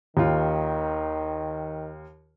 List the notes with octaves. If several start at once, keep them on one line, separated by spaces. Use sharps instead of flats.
D#2 D#3 F4